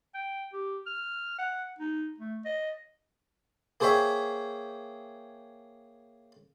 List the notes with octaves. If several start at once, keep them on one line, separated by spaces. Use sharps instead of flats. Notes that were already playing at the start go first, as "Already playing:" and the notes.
G5
G4
F6
F#5
D#4
A3
D#5
A#3 G#4 C5 C#5 E5 G5